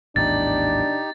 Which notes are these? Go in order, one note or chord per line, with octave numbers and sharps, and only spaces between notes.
A#1 E2 A2 D4 D#4 G4 A6